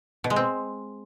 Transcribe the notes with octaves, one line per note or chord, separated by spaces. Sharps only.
B2
G#3
C4